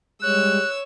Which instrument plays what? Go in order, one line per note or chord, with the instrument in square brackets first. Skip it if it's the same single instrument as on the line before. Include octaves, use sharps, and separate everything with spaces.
[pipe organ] G3 G#3 [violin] C#5 E6 [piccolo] F#6